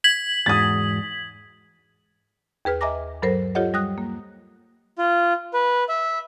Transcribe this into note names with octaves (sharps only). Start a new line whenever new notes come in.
G#6 B6 F#7
E2 G#2 F#4 D#6 A6
D#2 G#4 B4 F6
D#5 E5 G#5 A#5 D6 A#6
G2 F#3 A4 A#4 C5
F4 G4 A4 C#5 D#5 F#5
G3 D#6 F#6
A#3
F4
B4
E5